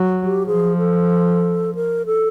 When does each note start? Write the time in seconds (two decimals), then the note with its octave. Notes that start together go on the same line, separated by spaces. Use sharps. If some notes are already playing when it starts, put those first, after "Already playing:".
Already playing: F#3
0.24 G4
0.45 F3 G#4
0.78 A4
1.75 A#4
2.06 A4